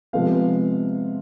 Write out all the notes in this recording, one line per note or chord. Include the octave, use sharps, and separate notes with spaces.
C3 F3 G#3 B3 F5